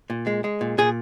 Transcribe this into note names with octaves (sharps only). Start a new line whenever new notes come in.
A#2
G#3
G#3
A#2
A#2 G#4